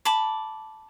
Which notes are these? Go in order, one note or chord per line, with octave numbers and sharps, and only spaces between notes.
A5 B5 D6